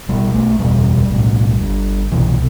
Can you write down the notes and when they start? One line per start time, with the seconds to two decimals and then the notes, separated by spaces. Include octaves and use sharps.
0.09 B1 B2 G3
0.34 A3
0.59 F#1 E2 B2 G3
1.10 B1 A2
1.61 G1 G2
2.11 C2 B2 E3